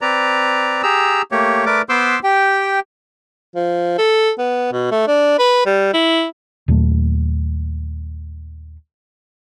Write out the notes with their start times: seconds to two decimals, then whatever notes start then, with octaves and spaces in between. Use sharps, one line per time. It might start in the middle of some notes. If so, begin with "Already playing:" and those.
0.01 C4 B4 D5 A#5
0.83 G4 G#4 A#5 E6
1.32 A3 A#3 G4 C#5
1.66 A3 A#4 B4 D5 D6
1.89 B3 B4 C5 C6 D6 E6
2.24 G4 G5
3.55 F3
3.98 A4
4.38 B3
4.72 B2
4.91 A3
5.07 D4
5.39 B4
5.66 G3
5.93 E4
6.68 D#2 A#2 F#3 A3